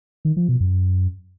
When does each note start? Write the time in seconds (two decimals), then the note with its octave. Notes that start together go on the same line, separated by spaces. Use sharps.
0.25 D#3
0.37 F3
0.48 B2
0.60 F#2